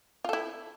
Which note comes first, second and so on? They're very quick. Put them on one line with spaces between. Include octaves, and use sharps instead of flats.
F4 A4 E4